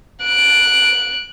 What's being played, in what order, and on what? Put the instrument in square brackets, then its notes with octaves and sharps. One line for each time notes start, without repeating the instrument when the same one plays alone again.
[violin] F#6 D7